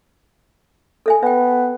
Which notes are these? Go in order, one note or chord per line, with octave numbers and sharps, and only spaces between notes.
A4 E5 G#5
B3 E5 G5